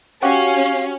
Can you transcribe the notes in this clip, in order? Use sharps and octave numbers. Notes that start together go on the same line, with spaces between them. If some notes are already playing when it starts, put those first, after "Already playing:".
C#4 F#4 G4 F5